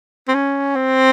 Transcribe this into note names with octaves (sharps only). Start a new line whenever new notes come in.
C4
C#4
C4